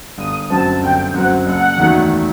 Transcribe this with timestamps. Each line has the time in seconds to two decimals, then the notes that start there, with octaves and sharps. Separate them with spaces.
0.18 G1 D#6
0.50 F#2 F#3 C4 A5
0.82 G1 G5
1.14 F#2 F#3 C4 F#5
1.46 F#1 F#5
1.78 E2 D#3 F#3 A3